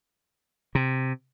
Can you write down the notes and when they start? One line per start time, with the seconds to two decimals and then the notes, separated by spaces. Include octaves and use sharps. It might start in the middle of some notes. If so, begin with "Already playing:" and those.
0.75 C3